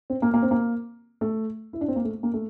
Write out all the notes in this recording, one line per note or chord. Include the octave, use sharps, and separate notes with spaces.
C4
A#3
A#3
C4
A#3
A3
E4
D4
C4
A#3
A3
A#3
A3